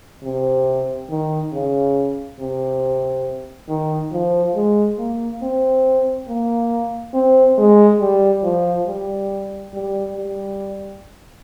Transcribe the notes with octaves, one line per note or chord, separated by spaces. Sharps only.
C3
D#3
C#3
C3
D#3
F3
G#3
A#3
C4
A#3
C4
G#3
G3
F3
G3
G3
G3